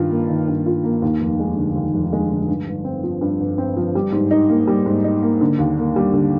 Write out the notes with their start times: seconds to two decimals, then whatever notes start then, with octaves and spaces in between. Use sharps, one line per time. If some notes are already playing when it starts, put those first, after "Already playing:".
Already playing: G2 D#3 F4
0.11 A#3
0.29 D#3
0.48 G2
0.66 F4
0.84 A#3
1.02 D#2
1.21 F1
1.39 G#3
1.56 D3
1.76 D#2
1.94 F1
2.12 G#3
2.30 D3
2.48 G2
2.67 G1
2.84 C4
3.04 F3
3.21 G2
3.40 G1
3.58 C4
3.77 F3
3.95 G3
4.12 G#2
4.31 D#4
4.49 A#3
4.67 G3
4.86 G#2
5.04 D#4
5.22 A#3
5.41 D3
5.59 D#2
5.77 A#3
5.96 G3
6.14 D3